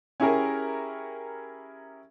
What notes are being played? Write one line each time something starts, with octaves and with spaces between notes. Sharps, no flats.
C#4 E4 G4 G#4 A#4